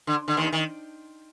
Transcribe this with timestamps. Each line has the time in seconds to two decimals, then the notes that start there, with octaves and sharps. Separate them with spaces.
0.07 D3
0.28 D3
0.37 D#2 D#3
0.52 D#3